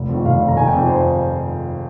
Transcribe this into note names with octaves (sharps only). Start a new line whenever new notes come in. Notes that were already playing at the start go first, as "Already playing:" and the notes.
Already playing: F1
F2 D#3
F1 F5
F2 D#3
A#5
F1 G#5
G5
F2 D#3
C5